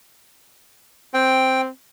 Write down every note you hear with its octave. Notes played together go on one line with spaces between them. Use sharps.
C4 G5